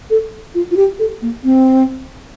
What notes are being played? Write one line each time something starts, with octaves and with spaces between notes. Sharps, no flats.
A4
F4
F4
G4
A4
A#3
C4